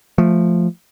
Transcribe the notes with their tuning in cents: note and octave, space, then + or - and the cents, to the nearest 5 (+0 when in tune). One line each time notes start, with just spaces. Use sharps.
F3 +0 A3 +0